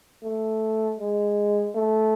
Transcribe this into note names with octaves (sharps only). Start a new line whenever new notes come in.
A3
G#3
A3